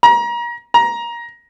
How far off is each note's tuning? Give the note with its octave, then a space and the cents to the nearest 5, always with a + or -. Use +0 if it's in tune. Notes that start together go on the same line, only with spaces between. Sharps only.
A#5 +30
A#5 +15